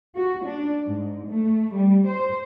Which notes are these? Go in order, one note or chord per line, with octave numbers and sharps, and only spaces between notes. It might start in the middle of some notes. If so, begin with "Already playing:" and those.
F#4
D4
G#2
A3
G3
C5